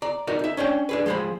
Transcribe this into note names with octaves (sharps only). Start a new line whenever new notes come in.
D5 A#5
D#4 F#4 A#4 D5
D#4 E5
C#4 D4 C#5 G5
D4 G#4 B4
F3 G#3 G#4 C5 B5